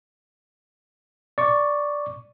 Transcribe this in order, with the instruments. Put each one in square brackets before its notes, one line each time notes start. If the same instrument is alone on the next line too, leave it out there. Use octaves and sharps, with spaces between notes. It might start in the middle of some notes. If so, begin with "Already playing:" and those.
[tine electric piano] D5 C#6